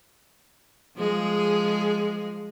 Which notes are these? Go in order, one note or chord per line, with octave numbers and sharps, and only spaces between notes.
F3 G#3 G#4